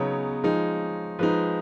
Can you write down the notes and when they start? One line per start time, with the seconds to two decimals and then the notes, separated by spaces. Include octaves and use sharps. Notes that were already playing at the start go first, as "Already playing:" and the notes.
Already playing: C#3 F#3 B3 D#4 C#5
0.43 F3 G#3 D#4
1.19 F3 G#3 D#4 B4